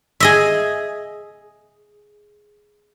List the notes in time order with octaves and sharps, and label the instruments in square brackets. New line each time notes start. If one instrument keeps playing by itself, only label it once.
[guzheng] G#4 D#5 E5